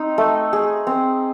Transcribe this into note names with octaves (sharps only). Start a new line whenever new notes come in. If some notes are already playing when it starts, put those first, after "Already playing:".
Already playing: C4 D#4
A3
G#4
C4